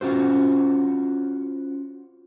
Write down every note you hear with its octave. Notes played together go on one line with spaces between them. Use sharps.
C#4 F4 F#4 C5